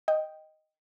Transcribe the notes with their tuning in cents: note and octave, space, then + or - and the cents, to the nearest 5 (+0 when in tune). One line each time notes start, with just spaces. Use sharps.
D#5 +0 G5 +0